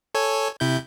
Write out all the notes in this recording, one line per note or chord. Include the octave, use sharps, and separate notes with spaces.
A4 C#5 G#5
C3 E4 G6